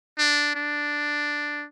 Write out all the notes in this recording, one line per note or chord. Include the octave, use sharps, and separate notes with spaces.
D4
D4